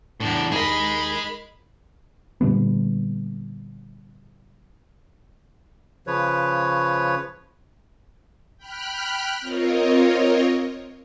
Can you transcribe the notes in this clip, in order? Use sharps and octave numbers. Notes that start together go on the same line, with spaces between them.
E2 A2 D4
D#2 D#4 G#4 A#4 D#5 B5
A#2 D3 G3 B3
C#3 F3 B4 C#5
G5 B5 F6 F#6
C4 F4 A#4 C#5 D#5